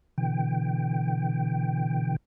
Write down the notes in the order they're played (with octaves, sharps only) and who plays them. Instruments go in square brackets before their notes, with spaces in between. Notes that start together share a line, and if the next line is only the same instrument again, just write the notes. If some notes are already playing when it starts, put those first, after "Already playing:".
[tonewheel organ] B2 D3 E3 G5